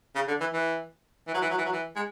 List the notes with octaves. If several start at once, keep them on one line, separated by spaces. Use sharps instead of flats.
C#3
D3
E3
E3
E3
F#3
E3
F#3
E3
F#3
E3
G#3